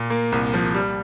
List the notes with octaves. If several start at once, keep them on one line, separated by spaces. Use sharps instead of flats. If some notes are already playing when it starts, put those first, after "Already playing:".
Already playing: A#2
A#3
C2
F3
G3